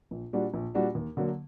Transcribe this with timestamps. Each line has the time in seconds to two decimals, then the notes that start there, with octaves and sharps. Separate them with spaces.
0.11 A#1
0.33 A#2 G3 D4 F#4
0.54 A#1
0.75 A#2 G3 D4 F#4
0.95 D#2
1.17 D3 F#3 A#3